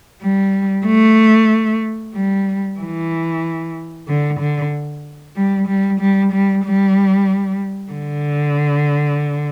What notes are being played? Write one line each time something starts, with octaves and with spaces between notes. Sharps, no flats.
G3
A3
G3
E3
D3
D3
G3
G3
G3
G3
G3
D3